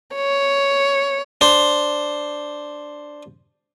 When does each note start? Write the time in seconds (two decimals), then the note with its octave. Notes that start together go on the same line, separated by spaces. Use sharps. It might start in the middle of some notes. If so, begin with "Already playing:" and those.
0.16 C#5
1.41 D4 C5